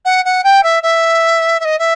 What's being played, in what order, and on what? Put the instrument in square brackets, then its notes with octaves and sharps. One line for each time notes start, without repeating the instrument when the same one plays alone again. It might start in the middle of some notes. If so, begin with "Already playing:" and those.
[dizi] F#5
F#5
G5
E5
E5
E5
D#5
E5